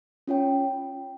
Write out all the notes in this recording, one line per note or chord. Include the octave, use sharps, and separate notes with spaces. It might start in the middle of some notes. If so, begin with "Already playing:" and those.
C#4 F4 C#5 G5